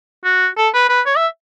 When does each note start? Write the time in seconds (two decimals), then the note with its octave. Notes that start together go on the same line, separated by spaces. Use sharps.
0.25 F#4
0.57 A4
0.74 B4
0.89 B4
1.06 C#5
1.16 E5